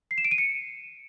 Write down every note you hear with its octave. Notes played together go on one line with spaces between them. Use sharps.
C7
E7
D7
D#7
C#7